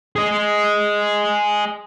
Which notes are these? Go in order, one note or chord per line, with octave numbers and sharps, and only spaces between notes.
G#4 D#5